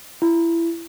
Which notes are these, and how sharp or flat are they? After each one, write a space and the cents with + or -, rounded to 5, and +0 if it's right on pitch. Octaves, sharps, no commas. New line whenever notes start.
E4 +20